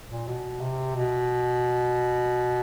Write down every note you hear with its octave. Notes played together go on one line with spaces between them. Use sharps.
A#2
B2
C3
B2